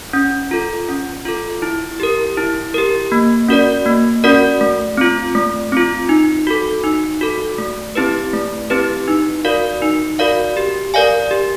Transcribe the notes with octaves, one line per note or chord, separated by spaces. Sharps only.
C#4
F4 A4
C#4
F4 A4
E4
G4 A#4
E4
G4 A#4
A#3
C#4 F#4 A#4 D5
A#3
C#4 F#4 A#4 D5
A3
C4 F4
A3
C4 F4
D#4
F#4 A4
D#4
F#4 A4
A3
C4 E4 G4 B4
A3
C4 E4 G4 B4
D#4
F#4 A#4 D5 F5
D#4
F#4 A#4 D5 F5
G4
A#4 D5 F5 G#5
G4